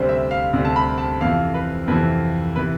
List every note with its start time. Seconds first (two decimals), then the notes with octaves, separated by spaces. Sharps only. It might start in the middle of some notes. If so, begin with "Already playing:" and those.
Already playing: D2 C3 G3 C5
0.09 E5
0.31 F5
0.53 D2 C3 G3
0.65 A5
0.76 B5
0.98 A5
1.21 F2 C3 E3 F5
1.54 B4
1.88 F2 C3 E3 B4
2.56 C3 E3 B4